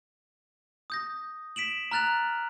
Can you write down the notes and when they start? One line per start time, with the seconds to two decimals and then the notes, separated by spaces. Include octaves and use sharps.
0.90 D#6 G6 A#6
1.56 B6 D7 E7 F#7
1.91 A#5 F6 F#6 A6 F7